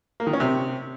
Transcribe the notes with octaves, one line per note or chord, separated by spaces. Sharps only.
A#3
D#3
C#4
C3